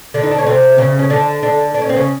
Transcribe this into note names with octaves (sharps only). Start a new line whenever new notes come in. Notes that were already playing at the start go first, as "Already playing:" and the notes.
D3 D4
D#4
D4
C#4
C3 C4
C#3 C#4
C#4
D3 D4
D3 D4
D4
C#4
C4
C#3 C#4